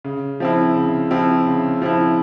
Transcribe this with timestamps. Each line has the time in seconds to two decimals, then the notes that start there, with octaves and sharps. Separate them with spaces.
0.05 C#3
0.40 F3 C4 E4
0.76 C#3
1.11 F3 C4 E4
1.47 C#3
1.82 F3 C4 E4